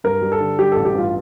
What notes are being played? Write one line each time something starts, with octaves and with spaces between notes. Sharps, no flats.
G2 A#4
G3
A4
D3
G3 G4
A1 A4
G4
G2 F4